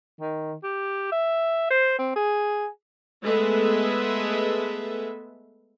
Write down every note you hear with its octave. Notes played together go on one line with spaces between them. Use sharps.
D#3
G4
E5
C5
C4
G#4
G#3 A3 B3 A4 B4 E5